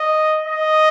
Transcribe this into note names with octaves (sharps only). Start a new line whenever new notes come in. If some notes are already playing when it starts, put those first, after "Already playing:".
Already playing: D#5
D#5